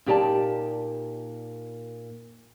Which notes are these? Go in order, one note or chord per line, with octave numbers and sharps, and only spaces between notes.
A#2 D#4 G4 D5 G#5 A5